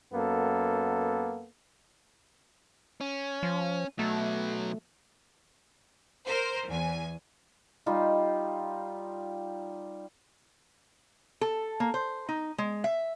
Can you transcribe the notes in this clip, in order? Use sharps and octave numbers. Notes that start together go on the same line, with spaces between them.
F#2 A#3 B3 A4
C#4
F3
B2 F#3 A3
A#4 C5
E2 G#5
G3 D#4 F4 G4
A4
A#3
C5
D#4
G#3
E5